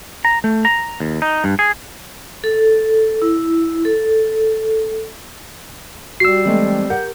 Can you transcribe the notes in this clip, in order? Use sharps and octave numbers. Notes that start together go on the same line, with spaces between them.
A#5
A3
A#5
D#2
D#4
G2
G#4
A4
E4
A4
G3 F#4 E6 C7
E3 G#3 A3 C4
G4 A#4 F#5 G6